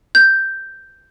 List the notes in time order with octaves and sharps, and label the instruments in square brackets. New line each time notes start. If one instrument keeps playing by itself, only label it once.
[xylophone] G6